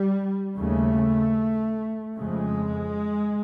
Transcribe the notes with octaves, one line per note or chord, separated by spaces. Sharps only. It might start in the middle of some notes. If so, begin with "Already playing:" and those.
Already playing: G3
D#2 C#3 A3
F2 C#3 G#3